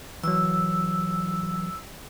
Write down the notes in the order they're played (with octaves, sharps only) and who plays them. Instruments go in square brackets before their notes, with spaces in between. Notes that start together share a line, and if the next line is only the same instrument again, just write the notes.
[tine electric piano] E3 F#3 [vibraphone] E6